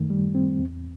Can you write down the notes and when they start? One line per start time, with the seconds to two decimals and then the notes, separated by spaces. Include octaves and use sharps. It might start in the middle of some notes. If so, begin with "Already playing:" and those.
Already playing: F#2 D#3 A3
0.10 G3
0.35 C4
0.59 E2